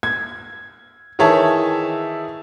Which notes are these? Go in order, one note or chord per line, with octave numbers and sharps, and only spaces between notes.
G#6
D#3 E3 G#4 C#5 E5 A5